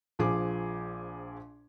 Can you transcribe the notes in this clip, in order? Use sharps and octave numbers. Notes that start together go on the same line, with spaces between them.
A#1 F3 G#4 D6